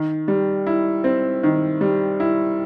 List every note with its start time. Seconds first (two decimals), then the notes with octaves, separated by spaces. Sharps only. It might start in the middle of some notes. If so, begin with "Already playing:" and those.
Already playing: D#3
0.28 G3
0.67 E4
1.04 C4
1.43 D#3
1.81 G3
2.20 E4